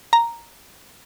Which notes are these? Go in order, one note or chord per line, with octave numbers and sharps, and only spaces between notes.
A#5